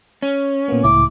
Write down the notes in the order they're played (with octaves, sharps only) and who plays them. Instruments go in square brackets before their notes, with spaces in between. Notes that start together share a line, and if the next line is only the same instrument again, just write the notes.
[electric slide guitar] C#4
[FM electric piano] A#2 A#3 B3
[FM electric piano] C#2 A2 E4 [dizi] D6